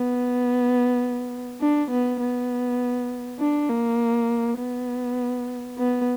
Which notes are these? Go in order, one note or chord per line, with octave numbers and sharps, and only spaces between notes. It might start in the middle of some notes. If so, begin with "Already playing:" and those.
Already playing: B3
D4
B3
B3
D4
A#3
B3
B3